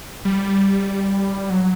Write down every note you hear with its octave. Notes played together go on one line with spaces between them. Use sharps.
G3
F#3